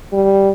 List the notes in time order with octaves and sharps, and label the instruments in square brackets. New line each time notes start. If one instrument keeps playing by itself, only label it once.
[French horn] G3